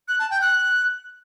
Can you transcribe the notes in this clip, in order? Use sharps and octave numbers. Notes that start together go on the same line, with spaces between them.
F#6
A5
G5
F#6